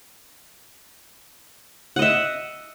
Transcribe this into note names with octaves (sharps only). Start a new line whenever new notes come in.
D#5 E5 F#5